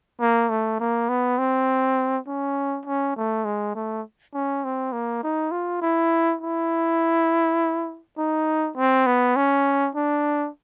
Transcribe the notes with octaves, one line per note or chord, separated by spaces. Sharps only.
A#3
A3
A#3
B3
C4
C#4
C#4
A3
G#3
A3
C#4
C4
A#3
D#4
F4
E4
E4
D#4
C4
B3
C#4
D4